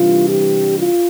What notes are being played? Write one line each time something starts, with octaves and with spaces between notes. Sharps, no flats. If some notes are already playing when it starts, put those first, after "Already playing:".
Already playing: C3 E3 G3 D4 F4
G4
F4